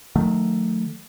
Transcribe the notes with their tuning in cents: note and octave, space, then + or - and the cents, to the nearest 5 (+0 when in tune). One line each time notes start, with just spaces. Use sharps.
D#3 +0 F#3 -30 A3 +10